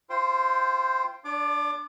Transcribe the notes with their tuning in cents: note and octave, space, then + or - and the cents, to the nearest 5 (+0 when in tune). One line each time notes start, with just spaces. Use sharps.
F4 -30 C5 +0 G5 +0
D4 +0 D5 -40 D6 +25